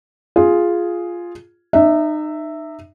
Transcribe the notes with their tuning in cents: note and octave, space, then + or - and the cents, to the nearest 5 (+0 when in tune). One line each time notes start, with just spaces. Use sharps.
F4 +0 G#4 +0
D#4 -30 E5 +0